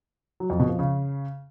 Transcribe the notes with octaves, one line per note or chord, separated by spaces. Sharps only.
F#3
F2
B2
F3
C#3